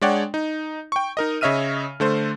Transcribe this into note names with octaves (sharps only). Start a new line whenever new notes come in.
G#3 D4 C#5 D5 F#5 G5
D#4
G5 C#6
D#4 A#4 D#5
C#3 C#5 D#5 E5 F6 D#7
D3 A3 C5